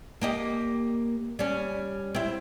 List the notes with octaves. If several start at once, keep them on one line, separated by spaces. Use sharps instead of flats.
A#3 G4 D#5
G3 C#4
C4 E4